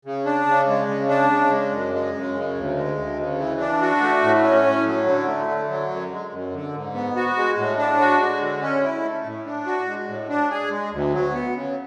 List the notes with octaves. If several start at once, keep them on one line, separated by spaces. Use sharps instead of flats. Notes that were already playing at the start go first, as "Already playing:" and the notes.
C#3
D4
C#3
G#3
C#3
D4
C#3
G#3
F#2
G#3
F#2
C#3
D2
G#3
D2
C#3
E3
D4
F#4
A3
A2
C#4
A2
F#3
D3
A3
D3
F#3
F#2
G#3
F#2
D3
G#2
B3
F#4
G#3
A2
D4
F#4
G#3
D3
C#4
E4
A3
A2
D4
F#4
G#3
A2
D4
G#4
G#3
D2
F#3
B3
C#3